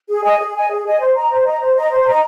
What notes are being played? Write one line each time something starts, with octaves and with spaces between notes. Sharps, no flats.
G#4
D#5 G#5
G#4
D#5 G#5
G#4
D#5 G#5
C5
D#5 A#5
C5
D#5 A#5
C5
D#5 A#5
C5
D#5 A#5